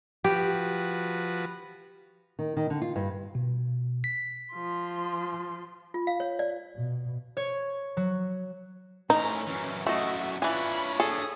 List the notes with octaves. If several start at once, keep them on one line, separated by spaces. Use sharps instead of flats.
F3 F#4 G4 B4
D#3
D#3
D3
F4
G2
B2
B6
F3 C6
F4
F5
C#5
D5
B2
C#5
F#3
A2 C#4 D#4 A#5
F#2 E3
F#2 A3 E4 F#4 D#5
E3 D4 F4 C#5 G#5 B5
G#4 A4 D#6